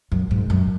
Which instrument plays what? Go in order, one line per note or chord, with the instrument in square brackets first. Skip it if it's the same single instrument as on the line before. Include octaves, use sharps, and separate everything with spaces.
[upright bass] F#2
G#2
F#2